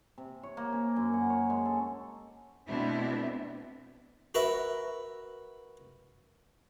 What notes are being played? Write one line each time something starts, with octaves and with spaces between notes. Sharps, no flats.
C3
C#5
A#3
C#4
F#2
F#5
C#5
G#3
A4
B2 A3 B3 C4 D4 E4
F#4 A#4 B4 E5